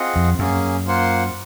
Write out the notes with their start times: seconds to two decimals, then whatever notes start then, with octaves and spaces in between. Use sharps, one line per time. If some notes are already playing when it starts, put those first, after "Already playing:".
Already playing: C4 F4 G#4 D#5 F#5
0.16 F2
0.39 F#2 A#3 C#4 G#4
0.86 A#3 F4 C5 F#5